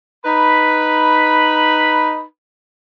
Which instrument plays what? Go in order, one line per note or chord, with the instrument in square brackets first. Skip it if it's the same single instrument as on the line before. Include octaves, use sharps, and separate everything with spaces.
[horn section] D#4 B4 B5